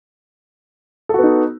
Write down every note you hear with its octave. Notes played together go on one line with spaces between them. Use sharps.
B3 D#4 F#4 A4